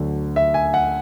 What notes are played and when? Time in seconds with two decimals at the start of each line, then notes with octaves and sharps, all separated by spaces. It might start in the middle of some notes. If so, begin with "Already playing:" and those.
Already playing: D2 D3 F#3 A3
0.36 E5
0.54 G#5
0.74 F#5